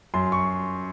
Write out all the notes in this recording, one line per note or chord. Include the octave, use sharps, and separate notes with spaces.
F#2 C6
C#6